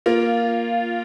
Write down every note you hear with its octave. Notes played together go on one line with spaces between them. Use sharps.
A#3 F4